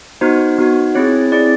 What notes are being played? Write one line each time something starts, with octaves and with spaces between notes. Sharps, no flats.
B3 D#4 F#4 C5
B3 D#4 F#4
C4 E4 G#4 C#5
C4 E4 G#4 D5